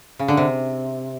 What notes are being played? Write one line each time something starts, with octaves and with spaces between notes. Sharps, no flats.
C#3
D3
C3